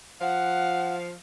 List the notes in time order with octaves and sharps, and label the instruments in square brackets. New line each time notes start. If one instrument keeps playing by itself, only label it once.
[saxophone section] F3 F5 [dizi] F#5